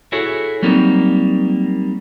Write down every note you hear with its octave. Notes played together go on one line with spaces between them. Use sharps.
E4 F#4 G#4 A4 C#5
F#3 G3 A#3 C4 D#4